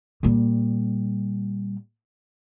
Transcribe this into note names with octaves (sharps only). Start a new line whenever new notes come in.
A#2 G3